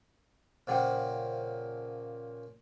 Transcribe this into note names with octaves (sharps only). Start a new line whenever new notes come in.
A#2 C#3 F3 C5 F#5 G5